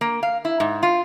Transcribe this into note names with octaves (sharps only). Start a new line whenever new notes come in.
A#3
F5
E4
G#2
F4